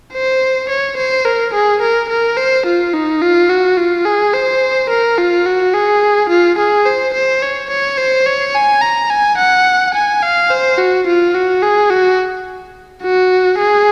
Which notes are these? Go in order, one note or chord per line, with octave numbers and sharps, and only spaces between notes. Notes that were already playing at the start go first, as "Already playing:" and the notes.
C5
C#5
C5
A#4
G#4
A#4
A#4
C5
F4
D#4
F4
F#4
F4
G#4
C5
A#4
F4
F#4
G#4
F4
G#4
C5
C5
C#5
C#5
C5
C#5
G#5
A#5
G#5
F#5
G#5
F5
C5
F#4
F4
F#4
G#4
F#4
F#4
G#4